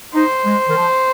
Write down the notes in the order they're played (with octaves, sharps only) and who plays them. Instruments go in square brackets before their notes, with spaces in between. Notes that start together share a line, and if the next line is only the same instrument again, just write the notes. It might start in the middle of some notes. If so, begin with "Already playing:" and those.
[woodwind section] D#4 [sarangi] C5
[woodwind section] G#3
D#3
F3